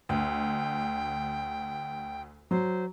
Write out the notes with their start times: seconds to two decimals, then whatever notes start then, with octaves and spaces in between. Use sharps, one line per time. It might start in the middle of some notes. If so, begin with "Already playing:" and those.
0.09 D2 G5
2.51 F#3 C5